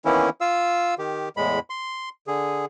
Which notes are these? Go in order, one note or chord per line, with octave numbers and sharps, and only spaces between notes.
D#3 E3 A#3 B3 C#4 E4
F4 F5 E6
D#3 G4
E2 A2 G#3 B5
C6
D3 G#4